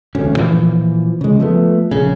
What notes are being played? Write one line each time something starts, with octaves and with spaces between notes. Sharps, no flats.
E1 D2 C#4
A#2 E3 F3
C#3 G#3
F3 A3 B3
A#1 C#3